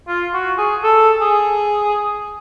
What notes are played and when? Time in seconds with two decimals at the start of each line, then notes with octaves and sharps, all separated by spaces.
0.08 F4
0.33 F#4
0.58 G#4
0.83 A4
1.21 G#4